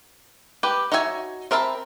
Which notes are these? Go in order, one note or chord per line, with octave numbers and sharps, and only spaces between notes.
G4 B4
D#4 F#4 C#5 E5 G#5
C4 A#4 E5 A5 B5